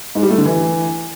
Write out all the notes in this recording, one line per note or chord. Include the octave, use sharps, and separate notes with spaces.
G#2
G3
A3
D3
E3